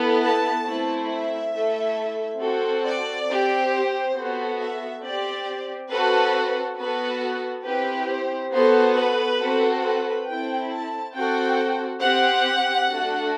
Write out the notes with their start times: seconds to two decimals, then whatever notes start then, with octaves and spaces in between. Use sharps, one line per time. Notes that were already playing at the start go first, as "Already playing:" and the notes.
Already playing: B3 E4 A4
0.23 A5
0.66 A3 C4 E4
1.10 E5
1.54 A3 E4 A4
2.41 C4 F#4 A4
2.85 D5
3.28 C4 G4
3.72 C5
4.16 B3 F#4 A4
4.59 E5
5.03 C4 G4 D5
5.91 C4 F#4 A4 B4
6.78 B3 F#4 A4 B4
7.65 C4 E4 G4 B4
8.09 C5
8.52 B3 F#4 A4 C5
8.96 B4
9.40 C4 F#4 A4
9.83 B4
10.27 C4 E4 A4 G5
10.71 A5
11.14 C4 F#4 A4 G5
12.02 C4 G4 F#5
12.90 A3 D4 F#4 A4